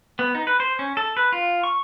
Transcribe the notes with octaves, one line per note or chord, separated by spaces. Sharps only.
B3
D#4
B4
C5
C#4
A4
B4
F4
C#6